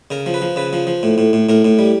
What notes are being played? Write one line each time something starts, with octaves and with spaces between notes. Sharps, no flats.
C#3 A#4
F3
B4
F3
C#3 B4
F3
F3
A2
A2
A2
A2 A#4
A2
G3